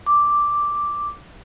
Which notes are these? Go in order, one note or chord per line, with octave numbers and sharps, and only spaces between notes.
D6